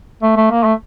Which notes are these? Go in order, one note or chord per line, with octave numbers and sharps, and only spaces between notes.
A3
A3
A#3
A3